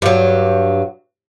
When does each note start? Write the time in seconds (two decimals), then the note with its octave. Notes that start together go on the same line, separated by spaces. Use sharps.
0.02 G2 F#3